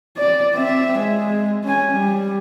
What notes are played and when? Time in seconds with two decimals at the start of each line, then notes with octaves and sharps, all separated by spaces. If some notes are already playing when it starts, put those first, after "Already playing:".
0.18 D5
0.55 C4 E5
0.99 G#3
1.64 C#4 G#5
1.92 G3